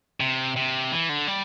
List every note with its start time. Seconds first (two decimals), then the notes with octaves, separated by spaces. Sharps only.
0.20 C3
0.56 C3
0.92 E3
1.09 D3
1.27 G3